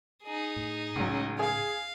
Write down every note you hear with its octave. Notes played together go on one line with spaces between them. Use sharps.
D#4 G#4
A2
C#2 A2 C#3 F#3
G#4 F5